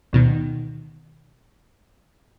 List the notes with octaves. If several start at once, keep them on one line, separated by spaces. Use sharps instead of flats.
D2 B2 D#3